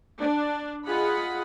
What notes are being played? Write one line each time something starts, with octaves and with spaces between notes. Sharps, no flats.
D4
F4 G#4 D#5 F#5 B5